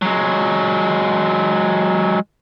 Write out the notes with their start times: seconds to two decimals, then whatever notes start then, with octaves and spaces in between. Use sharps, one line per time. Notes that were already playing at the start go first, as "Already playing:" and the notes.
0.02 F#3 G#3